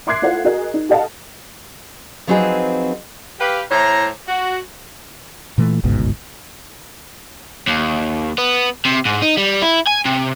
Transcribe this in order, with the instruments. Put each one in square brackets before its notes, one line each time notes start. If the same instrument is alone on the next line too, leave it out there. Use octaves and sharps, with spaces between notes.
[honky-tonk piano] E5 C6 D6 F#6 G#6 C7
E4 F4 A4 C5 F5 F#5
F#4 G#4 A#4 D#5
D#4
G4 A4 D#5 F5 F#5 A5
[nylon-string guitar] F3 F#3 C4 D#4 G#4 B4
[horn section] G4 B4 F5
A2 E4 C5 C#5 A#5
F#4
[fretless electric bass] A#2 E3 A3
G1 C#2 G#2 B2
[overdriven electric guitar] D#2
B3
C3
G#2
D#4
G3
E4
G#5
C3